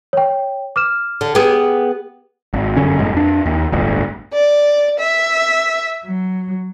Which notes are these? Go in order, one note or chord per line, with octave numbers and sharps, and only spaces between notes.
C#5 G5
D6 F6 E7
D3
B3 G4 G#4
G#1
G1 F#2 D3 C#4
G1 F#2 A2 G#3
F2 D4
D#2
D1 G1 D2
D5
E5
F#3